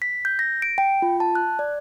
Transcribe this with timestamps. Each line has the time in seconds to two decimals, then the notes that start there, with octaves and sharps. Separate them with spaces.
0.02 B6
0.25 G6
0.39 A#6
0.62 D7
0.78 G5
1.02 F4
1.20 A5
1.35 F#6
1.59 D5